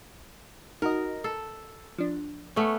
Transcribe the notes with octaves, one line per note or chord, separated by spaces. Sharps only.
D#4 F#4 A#4 D#5
A4
F3 D4
A3 B3 C#4